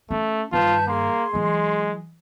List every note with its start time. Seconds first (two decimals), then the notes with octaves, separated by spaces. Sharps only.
0.11 A3 C#4
0.52 G2 D#3 F4 B4 A5 G6
0.87 A#3 G#4 C6
1.34 E3 F#3 G#3